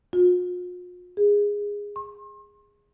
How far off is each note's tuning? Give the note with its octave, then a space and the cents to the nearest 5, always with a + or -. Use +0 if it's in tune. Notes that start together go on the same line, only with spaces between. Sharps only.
F4 +45
G#4 -15
C6 +40